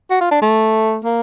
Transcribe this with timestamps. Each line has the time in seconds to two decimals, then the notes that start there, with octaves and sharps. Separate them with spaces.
0.11 F#4
0.21 F4
0.31 D4
0.42 A3
1.05 A#3